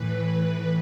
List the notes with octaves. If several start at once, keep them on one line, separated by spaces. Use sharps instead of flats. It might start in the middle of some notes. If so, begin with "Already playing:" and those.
Already playing: A2 E3 B4